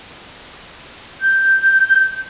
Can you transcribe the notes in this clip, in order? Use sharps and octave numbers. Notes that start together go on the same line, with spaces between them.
G6